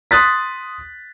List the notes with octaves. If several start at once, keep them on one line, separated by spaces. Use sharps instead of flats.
C6 D#6 F#6 A6 B6